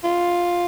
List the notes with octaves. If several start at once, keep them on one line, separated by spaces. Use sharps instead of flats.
F4